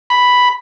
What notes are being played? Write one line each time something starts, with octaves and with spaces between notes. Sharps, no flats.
B5